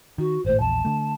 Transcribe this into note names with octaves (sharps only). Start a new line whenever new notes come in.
D#3 F#4
G#1 A2 C5
A#1 E2 A5
D3 A3